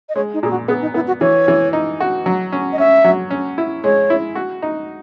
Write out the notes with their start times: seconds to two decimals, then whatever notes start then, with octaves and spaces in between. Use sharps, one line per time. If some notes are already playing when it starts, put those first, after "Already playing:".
0.09 D#5
0.16 G#3 C#5
0.34 D#4
0.43 A#2 G#4
0.51 F#4
0.68 B3 G#4
0.82 D#4
0.94 B3 E4
1.07 F#4
1.21 E3 C#5
1.48 E3
1.73 D#4
2.00 F#4
2.26 F#3
2.52 C#4
2.73 D#5
2.78 C#4 E5
3.04 F#3
3.30 C#4
3.58 E4
3.84 G#3 C#5
4.10 E4
4.35 F#4
4.62 D#4